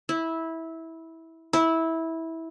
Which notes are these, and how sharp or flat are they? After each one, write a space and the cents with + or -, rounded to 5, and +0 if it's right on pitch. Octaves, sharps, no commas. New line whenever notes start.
E4 -15
E4 -15